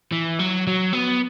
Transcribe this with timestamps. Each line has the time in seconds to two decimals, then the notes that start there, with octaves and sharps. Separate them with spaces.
0.12 E3
0.39 F#3
0.67 F#3
0.93 B3